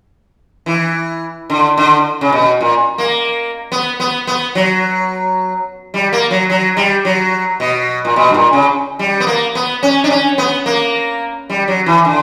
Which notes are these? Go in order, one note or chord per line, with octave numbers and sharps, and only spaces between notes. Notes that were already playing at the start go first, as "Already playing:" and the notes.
E3
D3
D3
C#3
B2
A#2
A#3
B3
B3
B3
F#3
G3
A#3
F#3
F#3
G3
F#3
B2
A#2
B2
G2
A#2
C#3
G3
B3
A#3
B3
C#4
D4
C#4
B3
A#3
G3
F#3
E3
D3